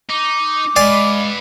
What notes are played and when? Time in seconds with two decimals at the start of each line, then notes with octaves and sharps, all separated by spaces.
0.10 D#4 D6
0.76 G#3 B4 D5 F5 G#5 C6